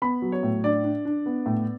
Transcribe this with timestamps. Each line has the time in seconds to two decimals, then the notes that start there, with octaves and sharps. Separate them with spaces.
0.02 B3 B5
0.22 F#3
0.32 C#5
0.43 A2
0.64 D4 D5
0.84 D4
1.05 D4
1.26 B3
1.46 A2